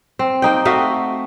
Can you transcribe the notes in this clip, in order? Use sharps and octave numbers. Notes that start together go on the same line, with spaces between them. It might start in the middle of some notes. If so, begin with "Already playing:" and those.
C4
A#3 D#4 G5
A3 F#4 D#5 F5